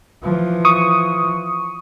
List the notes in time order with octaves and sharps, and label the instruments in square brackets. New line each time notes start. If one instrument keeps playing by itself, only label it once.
[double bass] E3 F3
[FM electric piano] C#6 D#6